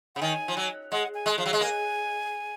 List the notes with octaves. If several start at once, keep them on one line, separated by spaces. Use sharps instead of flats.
C#3 F#5
D#3 G#5
F3
F#3
G#3 F#5
G#5
G#3
F3 F5
F#3
G#3
A#3 G#5